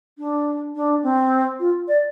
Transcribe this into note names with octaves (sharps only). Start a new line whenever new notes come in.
D4
D4
C4
F4
D5